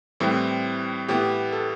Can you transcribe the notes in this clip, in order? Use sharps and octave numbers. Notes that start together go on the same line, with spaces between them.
A2 E3 G3 C4
A2 E3 B3 G4
A4